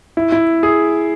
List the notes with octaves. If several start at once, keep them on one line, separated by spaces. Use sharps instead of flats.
E4
E4
G#4